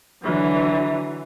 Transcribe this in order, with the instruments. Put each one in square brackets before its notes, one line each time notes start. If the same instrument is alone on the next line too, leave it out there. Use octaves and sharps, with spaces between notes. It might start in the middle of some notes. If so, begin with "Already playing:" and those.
[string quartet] D3 E3 F#3